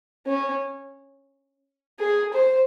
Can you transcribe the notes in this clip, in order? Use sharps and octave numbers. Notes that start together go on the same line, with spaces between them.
C#4
G#4
C5